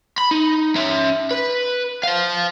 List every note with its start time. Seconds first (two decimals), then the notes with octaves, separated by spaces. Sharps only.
0.18 B5
0.31 D#4
0.76 C#4 E5
1.31 B4
2.03 C5 F5